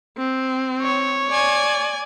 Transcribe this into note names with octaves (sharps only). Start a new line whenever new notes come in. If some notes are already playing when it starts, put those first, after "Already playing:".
C4
C#5
D5 G#5